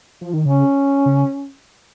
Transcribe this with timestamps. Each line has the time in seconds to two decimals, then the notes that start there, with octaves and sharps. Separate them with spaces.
0.21 F3
0.34 D#3
0.46 C#3 C#4
1.06 C#3